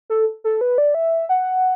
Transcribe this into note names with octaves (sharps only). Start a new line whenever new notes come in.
A4
A4
B4
D5
E5
F#5